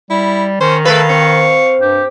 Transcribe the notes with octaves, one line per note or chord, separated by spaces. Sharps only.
G3 E4
D#3 C#4 C5
A3 A4 B4 F5
C4 C#6
G2 G4